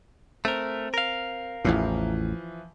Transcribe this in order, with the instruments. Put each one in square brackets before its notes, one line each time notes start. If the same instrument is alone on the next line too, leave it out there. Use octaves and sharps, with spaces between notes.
[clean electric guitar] A3 A#4 [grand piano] C4
[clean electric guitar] A#4 F5
[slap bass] A1 E2 A2 [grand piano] E3 F3